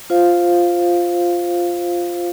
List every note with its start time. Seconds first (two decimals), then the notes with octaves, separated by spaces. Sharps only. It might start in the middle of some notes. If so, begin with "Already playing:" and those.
0.10 F4 C5 F5